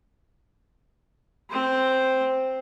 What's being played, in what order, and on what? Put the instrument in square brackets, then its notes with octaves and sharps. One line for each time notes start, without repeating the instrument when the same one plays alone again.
[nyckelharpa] C4 C5